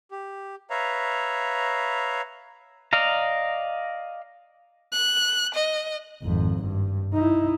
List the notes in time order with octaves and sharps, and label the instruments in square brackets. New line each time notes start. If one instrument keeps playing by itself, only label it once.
[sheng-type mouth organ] G4
B4 C#5 E5 F5 A#5
[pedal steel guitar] D5 D#5 F5 A#5
[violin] F#6
D#5
[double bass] G#1 F2
G2
D#4 E4